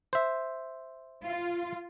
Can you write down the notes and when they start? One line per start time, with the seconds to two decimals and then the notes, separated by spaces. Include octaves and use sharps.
0.13 C5 E5
1.24 F4